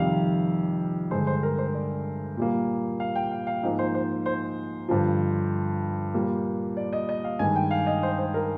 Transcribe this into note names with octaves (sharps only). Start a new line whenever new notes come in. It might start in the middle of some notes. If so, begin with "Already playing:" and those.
Already playing: F2 C3 D#3 G3 F5
G2 D3 G#3 C5
C5
A#4
C5
D5
A#2 G3 A#3
F5
G5
F5
F5
G#2 F3 A#3
C5
C5
C5
G2 D3 F3
A#2 G3 A#3
D5
D#5
D#5
F5
G2 D#3 G#3 G#5
G5
F5
D#5
C5
C5
A#4